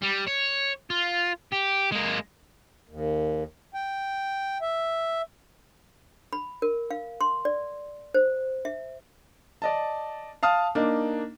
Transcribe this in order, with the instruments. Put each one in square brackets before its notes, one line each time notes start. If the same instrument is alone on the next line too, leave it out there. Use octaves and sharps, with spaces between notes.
[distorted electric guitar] G3
C#5
F4
G4
G#3 A#3
[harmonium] D#2
G5
E5
[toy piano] B5
A#4
F5
C6
D5
C5
E5
[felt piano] D5 D#5 A5
F5 A5 D#6 F6
A#3 D4 D#4